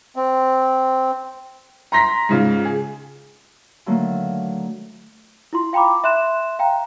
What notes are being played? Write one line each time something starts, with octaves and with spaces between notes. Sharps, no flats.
C4
A#5 C6 A#6 B6
G#2 C#3 F4
G#4
D3 D#3 F#3 A3 A#3
E4 F4 C6
F5 G5 A#5 B5 D6
E5 C6 F#6 E7
F5 G5 A#5